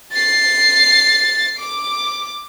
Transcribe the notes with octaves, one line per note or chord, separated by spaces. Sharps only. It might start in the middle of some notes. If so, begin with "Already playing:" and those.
A6 C7
D6